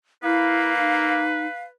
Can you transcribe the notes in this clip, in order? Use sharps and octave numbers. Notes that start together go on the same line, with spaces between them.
A#3 E4 B4 F5
D#4